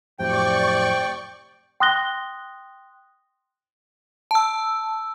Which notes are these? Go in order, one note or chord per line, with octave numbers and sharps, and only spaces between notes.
F2 A2 C3 F#3 D5 G5 C#6
G5 C6 D#6 F#6 A#6 G7
A5 E6